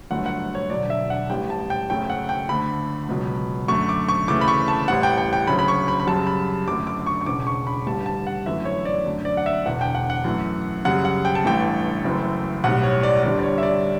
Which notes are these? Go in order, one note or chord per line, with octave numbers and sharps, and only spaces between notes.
G1 G2 F#3 A3 F#5
F#5
C#5
E1 D2 D3 F#3 D5
E5
F#5
A1 A2 G3 G5
A5
G5
F#1 F#2 C#3 F#3 A3 G5
F#5
G5
D2 D3 A3 B5
C#2 B2 F#3
F#2 D3 A3 C#6
D6
C#6
D2 C#3 E3 A3 D6
B5
C#6
A5
A1 A2 G3 F#5
G5
G5
G5
D2 C#3 F#3 B5
B5
C#6
B5
B5
F#2 C#3 G3 A5
B5
G1 F#2 D3 A3 D6
D6
C#6
C#6
E1 E2 C#3 D6
C#6
B5
A1 G2 D3 G3 A5
A5
F#5
G1 F#2 E3 A3 E5
C#5
D5
F#2 D3 A3
D5
F#5
E5
E1 E2 D3 F#5
G5
F#5
F#5
F#2 E3 A3
F#2 C#3 G3 F#5
F#5
G5
A5
A1 G2 E3 A3 G5
F#1 F#2 E3 A3
B1 A2 G3 F#5
C#5
D5
G1 G2 D3 G3 D5
D5
C#5
E5
D5